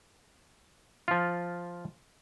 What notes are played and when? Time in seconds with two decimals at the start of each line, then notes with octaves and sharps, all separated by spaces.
1.08 F3 F4